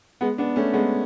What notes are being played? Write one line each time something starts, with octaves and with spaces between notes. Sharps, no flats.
G#3 B3
B3 D4
A3 C#4
G#3 B3